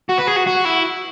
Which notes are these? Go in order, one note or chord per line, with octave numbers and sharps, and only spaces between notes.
F#4
B4
G#4
F#4
F#4
E4